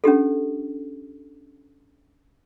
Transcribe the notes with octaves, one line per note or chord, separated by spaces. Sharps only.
C#4 D4 G4 A4